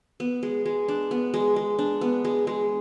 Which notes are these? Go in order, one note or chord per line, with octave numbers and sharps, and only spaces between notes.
B3
G#3
G#3
D4
B3
G#3
G#3
D4
B3
G#3
G#3